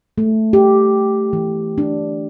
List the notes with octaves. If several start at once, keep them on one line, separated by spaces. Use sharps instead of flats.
A3
G4
E3
D4